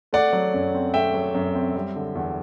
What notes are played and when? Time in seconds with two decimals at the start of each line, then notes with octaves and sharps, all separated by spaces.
0.13 A3 D5 F#5
0.33 F#3
0.54 F#2
0.74 C4
0.94 A3 E5 G5
1.14 F#3
1.34 F#2
1.55 C4
1.75 G3
1.96 D3
2.15 E2